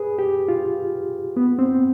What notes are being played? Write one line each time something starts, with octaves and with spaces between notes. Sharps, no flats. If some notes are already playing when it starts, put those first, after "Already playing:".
Already playing: G#4 B4
G4
F4
B3
C4